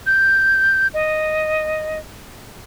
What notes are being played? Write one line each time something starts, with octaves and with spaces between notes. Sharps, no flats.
G6
D#5